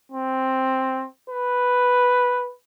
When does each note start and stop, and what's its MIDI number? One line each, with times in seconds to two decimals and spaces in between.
0.12 1.07 60
1.30 2.53 71